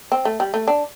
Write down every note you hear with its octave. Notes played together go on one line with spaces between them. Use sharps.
C4
A3
G3
A3
D4